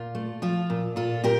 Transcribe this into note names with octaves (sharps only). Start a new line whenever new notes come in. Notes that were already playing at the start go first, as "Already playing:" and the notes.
Already playing: A#2 F4
A3
F3 F4
A#2
A#2 F4 A4
A#2 G4 A#4